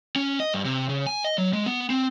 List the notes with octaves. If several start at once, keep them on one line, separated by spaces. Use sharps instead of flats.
C#4
D#5
G2
C3
C#3
G#5
D#5
F#3
G#3
B3
C4